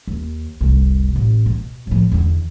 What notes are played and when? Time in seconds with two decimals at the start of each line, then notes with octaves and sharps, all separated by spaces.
0.08 D#2
0.61 F1 C2
1.16 A1
1.46 B2
1.87 A2 F3
2.12 E2 D3